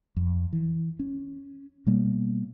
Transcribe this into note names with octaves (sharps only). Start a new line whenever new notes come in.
F2
E3
C#4
B2 G3 A#3